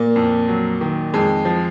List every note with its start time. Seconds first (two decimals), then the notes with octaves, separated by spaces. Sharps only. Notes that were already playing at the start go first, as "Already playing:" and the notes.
Already playing: A#2 A#3
0.16 F2
0.48 F#3
0.81 D#3
1.13 F2 G#3
1.45 F3